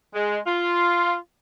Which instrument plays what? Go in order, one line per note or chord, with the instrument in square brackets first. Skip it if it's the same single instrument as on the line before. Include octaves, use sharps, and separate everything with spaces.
[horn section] G#3
F4